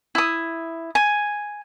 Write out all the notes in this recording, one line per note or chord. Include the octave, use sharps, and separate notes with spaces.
E4 D#6
G#5